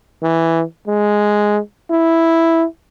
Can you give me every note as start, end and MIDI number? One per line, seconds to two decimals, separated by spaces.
0.23 0.64 52
0.88 1.60 56
1.91 2.65 64